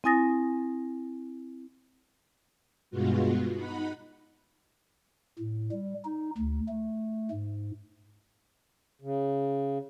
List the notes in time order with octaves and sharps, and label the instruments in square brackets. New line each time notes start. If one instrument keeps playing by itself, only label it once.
[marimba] C4 E4 G#5 D#6 A6 A#6
[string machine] G2 B2 G#3 B3 F4 F#4
D#4 F#5 B5
[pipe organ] A2
G3
D#4
D2
A3
G#2
[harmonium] C#3